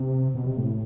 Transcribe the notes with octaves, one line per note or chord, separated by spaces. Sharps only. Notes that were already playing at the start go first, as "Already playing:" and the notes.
Already playing: C3
B2
C3
A2